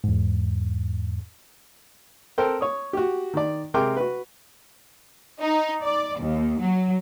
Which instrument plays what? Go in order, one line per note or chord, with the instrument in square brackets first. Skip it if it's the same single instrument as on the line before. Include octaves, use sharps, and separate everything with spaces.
[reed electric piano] E2 G#2
[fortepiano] C4 A4 A#4 C5 G5
C#5 D#6
F#4 G4
D#3 D5
C3 G#3 A#4 G5 C6 D6
F#4 B4
[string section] D#4
D5
D#2
F#3